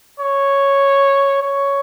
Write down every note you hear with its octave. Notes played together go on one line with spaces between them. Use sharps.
C#5
C#5